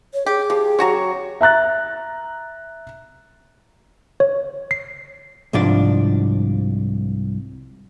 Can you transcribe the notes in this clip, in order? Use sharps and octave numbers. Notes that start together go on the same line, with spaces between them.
C#5
G4 G#4
F3 G4
C#3 F#3 F#4 C#5 A#5
E5 A#5 F#6 A6
C#5
C7
C2 G#2 F3 D4 D5